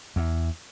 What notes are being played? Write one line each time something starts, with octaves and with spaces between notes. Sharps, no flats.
E2